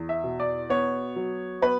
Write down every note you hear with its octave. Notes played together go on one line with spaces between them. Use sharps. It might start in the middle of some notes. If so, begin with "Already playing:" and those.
Already playing: E2
E5
B2
D5
B3 C#5
F#3
B3 B4